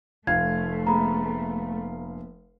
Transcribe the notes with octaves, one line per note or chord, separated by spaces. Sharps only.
F1 A3 F4 F5 G#6
A#3 B3 G#4 A#5 B5